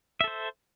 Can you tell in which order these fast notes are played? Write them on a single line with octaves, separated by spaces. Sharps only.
E5 A4 C5